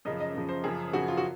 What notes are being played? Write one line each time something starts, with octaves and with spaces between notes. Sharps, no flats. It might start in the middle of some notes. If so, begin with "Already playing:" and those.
F#2 C#3 F3 D#5
D#5
F#2 C#3 F3
C5
F#2 C#3 F3 G#4
F#2 C#3 F3 F#4
F4
F#4